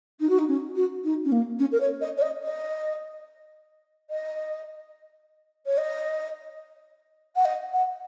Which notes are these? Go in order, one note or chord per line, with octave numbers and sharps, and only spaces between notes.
D#4
F#4
D#4
C#4
F#4
D#4
C#4
A#3
C#4
A#4
C#5
D#5
C#5
D#5
D#5
D#5
C#5
D#5
F#5
D#5
F#5